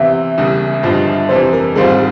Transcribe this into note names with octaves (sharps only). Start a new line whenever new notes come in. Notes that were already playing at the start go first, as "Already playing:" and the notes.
Already playing: E2 C3 E3 E5
E1 E2 C#3 G3
G1 G2 F3 G#3
F2 C3 E3 C5
A#4
G#1 G#2 G3 C4 F4 G#4
G4